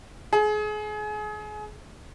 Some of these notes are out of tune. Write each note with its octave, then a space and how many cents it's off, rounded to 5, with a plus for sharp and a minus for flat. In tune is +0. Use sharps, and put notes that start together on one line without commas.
G#4 +30